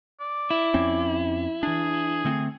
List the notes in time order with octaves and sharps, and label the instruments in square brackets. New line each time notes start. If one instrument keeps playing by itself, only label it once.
[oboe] D5
[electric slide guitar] E4
[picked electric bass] F2 C4 C#4
[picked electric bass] E3 D4 [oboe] G#4
[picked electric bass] D3 A3 C4